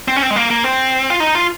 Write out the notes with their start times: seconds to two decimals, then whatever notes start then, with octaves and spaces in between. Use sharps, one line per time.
0.08 C4
0.16 C#4
0.22 C4
0.30 G#3
0.36 A#3
0.50 A#3
0.64 C4
1.10 F4
1.20 D#4
1.35 F4